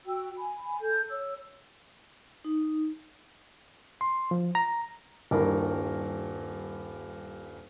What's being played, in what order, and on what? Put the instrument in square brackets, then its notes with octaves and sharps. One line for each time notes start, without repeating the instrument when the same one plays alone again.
[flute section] F#4 G5 E6
G#5 B5
A4 G6
C#5 E6
[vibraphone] D#4
[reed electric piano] C6
F3
A#5
[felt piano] D#1 G2 E4 A#4